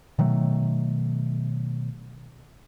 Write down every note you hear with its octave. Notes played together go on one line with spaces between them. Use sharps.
B2 D#3 F#3 A3